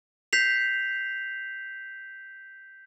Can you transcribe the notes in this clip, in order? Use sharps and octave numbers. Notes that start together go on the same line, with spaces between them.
G6 B6 C7 F7